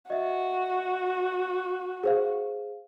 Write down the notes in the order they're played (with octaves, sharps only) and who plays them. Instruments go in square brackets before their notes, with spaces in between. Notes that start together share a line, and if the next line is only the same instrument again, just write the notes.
[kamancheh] F#4 [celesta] D#5 E5
[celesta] G#4 C5 F5